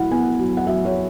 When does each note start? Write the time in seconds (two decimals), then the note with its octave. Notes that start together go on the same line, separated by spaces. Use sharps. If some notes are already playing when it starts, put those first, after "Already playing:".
Already playing: F#3 E4 F#5 B5
0.11 B3 G#5
0.39 F#3
0.57 F#5
0.67 F#3 E5
0.85 C#5